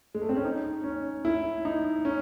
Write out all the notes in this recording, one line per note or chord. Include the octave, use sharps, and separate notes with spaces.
G#3
A3
C4
C#4
D#4
C#4
E4
D#4
C#4